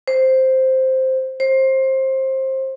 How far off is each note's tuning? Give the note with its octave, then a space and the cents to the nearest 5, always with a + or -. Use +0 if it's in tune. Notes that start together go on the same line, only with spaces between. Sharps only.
C5 +0
C5 +20